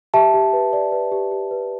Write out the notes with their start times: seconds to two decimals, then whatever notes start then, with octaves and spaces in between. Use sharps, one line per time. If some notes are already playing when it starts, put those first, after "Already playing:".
0.14 G4 E5 A5
0.34 G4
0.53 B4
0.73 D5
0.92 B4
1.12 G4
1.31 G4
1.51 B4